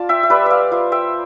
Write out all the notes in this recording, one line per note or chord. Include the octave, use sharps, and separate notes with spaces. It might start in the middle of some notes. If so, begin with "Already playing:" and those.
Already playing: F4 D5 A5
E5 G5
E5
G3 B4 D5
D5 E5 F5
F4 C5 E5
E5 G5